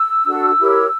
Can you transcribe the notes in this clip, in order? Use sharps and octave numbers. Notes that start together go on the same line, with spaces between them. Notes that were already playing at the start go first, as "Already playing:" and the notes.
Already playing: E6
D4 F#4 A4
E4 G4 A#4 C#5